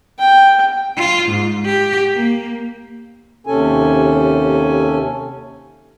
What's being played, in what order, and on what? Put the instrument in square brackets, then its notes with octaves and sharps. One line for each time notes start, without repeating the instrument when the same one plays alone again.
[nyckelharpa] G5
[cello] F4
G#2
G4
A#3
[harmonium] D#2 C3 C#4 A4 G#5